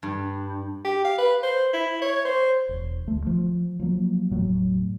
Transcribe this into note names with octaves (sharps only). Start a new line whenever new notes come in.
G2
G4
F5
B4
C5
E4
C#5
C5
E1
D2 A3
F3
F3 F#3 A#3
E1 A2 F#3 A3